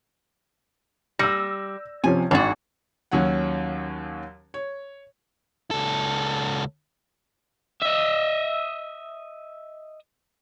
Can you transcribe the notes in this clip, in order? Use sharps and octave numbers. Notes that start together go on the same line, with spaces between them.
G3 E6 A#6
C3 F3 C#4 G#5
G#1 G#2 D4 F#4
D#2 F#3 C#4 C#5 F#5
C#5
C#2 A4
D#5 E5